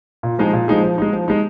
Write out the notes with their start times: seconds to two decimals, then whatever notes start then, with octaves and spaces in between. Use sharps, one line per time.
0.23 A#2
0.38 F3 G#3 D#4 G#4
0.53 A#2
0.68 F3 G#3 D#4 G#4
0.83 F3
0.98 G#3 D#4
1.13 F3
1.28 G#3 D#4